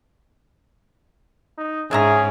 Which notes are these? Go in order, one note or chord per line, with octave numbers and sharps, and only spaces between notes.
D#4
G#2 C#4 D4 G#4 E5 A#5